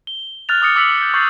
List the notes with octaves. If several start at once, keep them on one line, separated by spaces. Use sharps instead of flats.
G7
F6 F#6 A6 F7
D6 D#6 A6 C#7
D6 E6 B6 C#7 F7 F#7
G6
C#6 G6 A6 C7